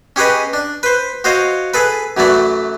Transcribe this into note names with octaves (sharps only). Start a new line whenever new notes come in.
C#4 G4 G#4 B4 D#5
D4
B4 C5
F#4 C5 C#5 D#5 F5
G#4 A4 B4
F#2 E3 F#3 A3 D5